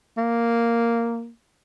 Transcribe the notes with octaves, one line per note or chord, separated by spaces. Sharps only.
A#3